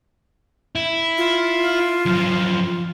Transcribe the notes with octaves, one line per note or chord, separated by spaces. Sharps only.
E4
F4
F#2 F3